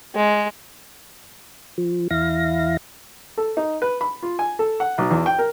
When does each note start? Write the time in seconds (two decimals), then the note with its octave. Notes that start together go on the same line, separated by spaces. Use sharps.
0.15 G#3
1.78 F3
2.10 E2 E4 F5 A#6
3.38 A4
3.57 D#4
3.82 B4
4.01 B5
4.23 F4
4.39 G#5
4.59 A4
4.80 F#5
4.98 B1
5.10 E2
5.26 G5
5.39 A#4